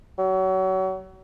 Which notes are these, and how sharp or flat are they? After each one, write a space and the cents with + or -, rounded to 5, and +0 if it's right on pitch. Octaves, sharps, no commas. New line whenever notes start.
F#3 +30